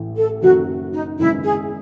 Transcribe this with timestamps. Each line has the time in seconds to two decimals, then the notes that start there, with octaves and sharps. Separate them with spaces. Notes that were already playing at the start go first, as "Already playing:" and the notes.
Already playing: A1 A2 E3 A3
0.17 A4
0.42 F#1 F#2 D#3 F#3 F#4
0.93 D#4
1.19 G#1 F#2 C#3 G#3 B3 E4
1.44 G#4